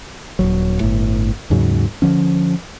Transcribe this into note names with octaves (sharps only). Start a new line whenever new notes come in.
D#1 G#1 F#3
G1 A2
D#2 G#2 C#3 F#3
D3 F3 C#4